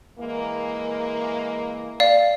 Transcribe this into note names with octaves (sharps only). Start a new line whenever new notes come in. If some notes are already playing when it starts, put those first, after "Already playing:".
E3 G#3 A#3
D5 F5